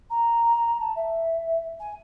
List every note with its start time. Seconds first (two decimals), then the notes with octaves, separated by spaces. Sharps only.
0.10 A#5
0.80 A5
0.96 E5
1.79 G#5